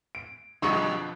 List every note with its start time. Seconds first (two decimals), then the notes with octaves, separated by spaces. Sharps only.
0.15 D7
0.62 F2 B2 D3 F#3 G#4 D#5 C#6